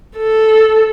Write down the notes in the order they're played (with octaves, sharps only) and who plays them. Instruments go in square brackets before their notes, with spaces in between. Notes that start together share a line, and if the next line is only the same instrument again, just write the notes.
[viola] A4